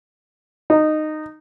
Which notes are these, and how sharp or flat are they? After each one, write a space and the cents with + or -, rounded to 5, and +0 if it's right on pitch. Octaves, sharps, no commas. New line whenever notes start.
D#4 -15